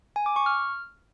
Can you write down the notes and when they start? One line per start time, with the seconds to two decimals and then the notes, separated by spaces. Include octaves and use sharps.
0.16 G#5
0.26 D6
0.36 C#6
0.46 F6